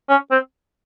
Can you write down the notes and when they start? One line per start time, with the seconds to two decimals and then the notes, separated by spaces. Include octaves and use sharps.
0.09 C#4
0.31 C4